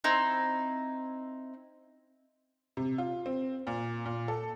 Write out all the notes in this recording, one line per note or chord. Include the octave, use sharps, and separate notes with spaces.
C4 D#4 E4
C3
F4
C4
A#2
A#2
A4